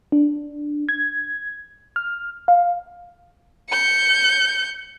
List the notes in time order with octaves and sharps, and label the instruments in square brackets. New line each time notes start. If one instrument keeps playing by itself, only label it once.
[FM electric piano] D4
G#6
F6
F5
[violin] G6 C#7